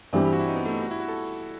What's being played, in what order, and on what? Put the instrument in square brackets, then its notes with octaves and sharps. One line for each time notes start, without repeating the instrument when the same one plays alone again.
[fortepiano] G2 E3 G3 [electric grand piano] C4
[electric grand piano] G4
F#4
E4
D#4
B3
A3
D#4
F#4
E4
F#4
A4